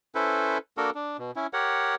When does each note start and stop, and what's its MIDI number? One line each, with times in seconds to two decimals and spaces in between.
0.15 0.58 61
0.15 0.58 64
0.15 0.58 69
0.15 0.58 71
0.15 0.58 72
0.77 0.90 58
0.77 0.90 62
0.77 0.90 66
0.77 0.90 69
0.77 0.90 70
0.95 1.17 62
1.18 1.31 47
1.36 1.47 61
1.36 1.47 64
1.53 1.95 67
1.53 1.95 70
1.53 1.95 73
1.53 1.95 78